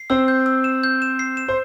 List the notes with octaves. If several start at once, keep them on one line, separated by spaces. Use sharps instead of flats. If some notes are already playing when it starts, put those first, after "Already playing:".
Already playing: C7
C4 C5 E6
G6
E6
E7
G6
E7
C7
E7
C5